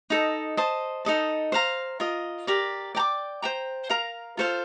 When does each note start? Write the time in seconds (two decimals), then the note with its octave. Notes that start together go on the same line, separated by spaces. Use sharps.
0.10 D#4 A4 D#5
0.57 C5 D#5 A5
1.05 D#4 A4 D#5 A5
1.52 C5 F5 A#5
2.00 F4 A#4 D#5
2.47 G4 A#4 D5
2.95 D5 G5 A#5 D6
3.42 C5 G5 A#5
3.89 A#4 F5 A#5
4.37 F4 A4 C5 F5